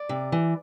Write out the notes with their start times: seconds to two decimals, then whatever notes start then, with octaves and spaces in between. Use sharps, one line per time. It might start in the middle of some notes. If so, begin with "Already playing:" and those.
Already playing: D5
0.09 C3
0.32 E3